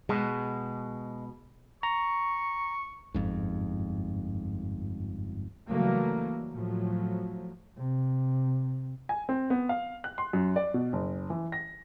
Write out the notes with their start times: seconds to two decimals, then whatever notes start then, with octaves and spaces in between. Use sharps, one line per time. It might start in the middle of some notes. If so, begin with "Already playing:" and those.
0.09 B2 G#3
1.83 A#5 C#6
3.14 G1 F2 G#2
5.69 C#3 E3 F#3 G3 A3 A#3
6.55 A2 F3 F#3
7.77 C3
9.09 G#5
9.29 C4
9.50 B3
9.69 F5
10.04 F#6
10.18 C6
10.33 F#2
10.56 D5
10.74 B2
10.93 F#1
11.30 E3
11.52 A#6